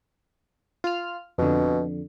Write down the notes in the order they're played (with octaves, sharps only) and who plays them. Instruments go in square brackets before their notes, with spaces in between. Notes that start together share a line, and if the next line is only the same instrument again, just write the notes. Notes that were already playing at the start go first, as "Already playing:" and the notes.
[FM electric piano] F4 F6
[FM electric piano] F2 D3 [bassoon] B2